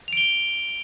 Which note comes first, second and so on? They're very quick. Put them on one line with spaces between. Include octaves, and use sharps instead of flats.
F7 D7 G7